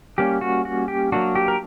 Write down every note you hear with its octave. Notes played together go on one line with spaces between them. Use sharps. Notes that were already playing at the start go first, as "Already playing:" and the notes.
G3 A#3 C#4 G4
F#4
F#4
G4
F#3 A#3 D4 F#4
G4
A#4